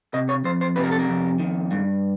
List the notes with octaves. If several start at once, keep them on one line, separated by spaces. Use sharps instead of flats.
C3 D#5
C#5
F2 C5
C5
C3 B4
A#4
A4
A#4
F2
D#3
G2